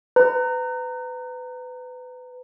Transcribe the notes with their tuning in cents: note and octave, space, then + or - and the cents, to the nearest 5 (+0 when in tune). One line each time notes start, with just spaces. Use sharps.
B4 +25 A#5 -20